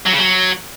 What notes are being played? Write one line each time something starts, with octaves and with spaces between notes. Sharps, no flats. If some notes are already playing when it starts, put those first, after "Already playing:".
F#3
C#3
F#3